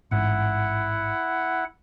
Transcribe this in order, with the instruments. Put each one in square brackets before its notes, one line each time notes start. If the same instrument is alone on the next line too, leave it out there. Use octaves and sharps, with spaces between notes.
[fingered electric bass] A1 G#2 [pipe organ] E4 F#5